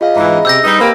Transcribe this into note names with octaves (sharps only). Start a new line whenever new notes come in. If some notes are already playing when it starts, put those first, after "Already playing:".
F4 G#4 D#5 F5
G#2 E3 E5 A#5 B5
C#4 G#4
C3 E6 G6 A#6
G3 D#4 B4 D#5
A#3 C4 G4 B5